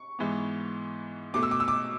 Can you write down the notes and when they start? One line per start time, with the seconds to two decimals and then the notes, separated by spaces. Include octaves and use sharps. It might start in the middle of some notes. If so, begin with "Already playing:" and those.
Already playing: C#6
0.19 G#2 E3 B3
1.34 B2 A3 D6
1.43 E6
1.51 D6
1.60 E6
1.68 D6